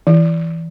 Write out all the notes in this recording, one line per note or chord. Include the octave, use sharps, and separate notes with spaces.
E3